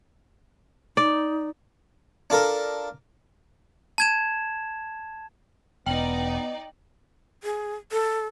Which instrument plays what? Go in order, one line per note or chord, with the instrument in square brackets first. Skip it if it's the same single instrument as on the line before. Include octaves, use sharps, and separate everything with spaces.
[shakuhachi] D#4 [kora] D5
[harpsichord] D4 F4 A4 A#4
[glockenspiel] A5 G#6 E7
[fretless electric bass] E1 [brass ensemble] B3 [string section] D#4 D5 [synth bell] G5 F#7
[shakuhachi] G#4
A4